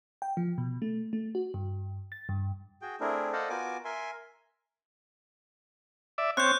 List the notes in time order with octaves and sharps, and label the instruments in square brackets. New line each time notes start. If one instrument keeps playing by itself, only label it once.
[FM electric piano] G5
F3
B2
A3
A3
F#4
G2
A6
G2
[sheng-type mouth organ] F#4 G#4 G5
A3 C4 D4 E4 G#4 A#4
A4 C5 D5 D#5 F5 F#5
B3 F4 F#4 A#4 G#5 D6
A#4 E5 G#5 C6
[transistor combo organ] D5 E5
[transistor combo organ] C4 C#5 [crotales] F#6 G6